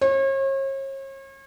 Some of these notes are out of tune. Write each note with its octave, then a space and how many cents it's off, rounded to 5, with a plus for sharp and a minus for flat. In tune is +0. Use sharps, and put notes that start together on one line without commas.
C#5 -40